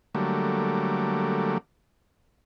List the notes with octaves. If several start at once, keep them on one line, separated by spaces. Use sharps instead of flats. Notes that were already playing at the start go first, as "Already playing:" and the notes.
D3 F#3 G3 A3 A#3